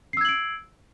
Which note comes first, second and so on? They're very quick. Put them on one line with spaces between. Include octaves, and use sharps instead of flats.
C7 E6 G#6 F#7 D7